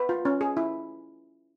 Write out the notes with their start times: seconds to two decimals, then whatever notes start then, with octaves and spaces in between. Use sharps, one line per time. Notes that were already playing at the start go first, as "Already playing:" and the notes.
Already playing: B4
0.09 F4
0.25 C#4
0.41 G#4
0.57 E4